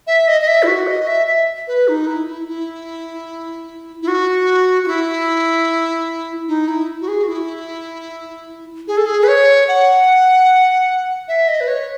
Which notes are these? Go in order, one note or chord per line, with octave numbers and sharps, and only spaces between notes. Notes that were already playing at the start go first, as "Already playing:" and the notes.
E5
D#5
D#5
E5
E4
F#4
D#5
E5
E5
B4
D#4
E4
E4
E4
E4
F#4
F#4
E4
D#4
E4
F#4
G#4
F#4
E4
G#4
A4
G#4
B4
C#5
F#5
E5
D#5
B4
C#5